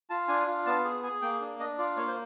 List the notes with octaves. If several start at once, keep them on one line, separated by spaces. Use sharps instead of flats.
F4 A5
D4 G#5
F4
B3 A5
G#4
G#4 G#5
A#3 G5
D4
D4 D#5
F4 D5
A#3 C#5
C5